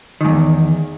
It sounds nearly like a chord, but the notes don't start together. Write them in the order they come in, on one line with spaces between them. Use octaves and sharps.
D#3 G#2 E2